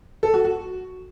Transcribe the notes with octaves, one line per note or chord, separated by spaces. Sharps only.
A4
F#4
F#4